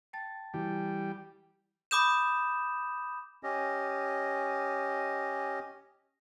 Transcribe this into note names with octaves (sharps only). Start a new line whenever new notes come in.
G5 A5 A6
E3 G3
B5 D6 D#6 G6 E7
C#4 G4 D#5